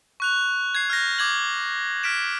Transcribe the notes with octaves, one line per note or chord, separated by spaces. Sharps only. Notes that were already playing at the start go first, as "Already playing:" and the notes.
C#6 F#6 F7
G#6 C7
F6 G6 A#6
D6 G#6 F#7
F6 B6 D7 E7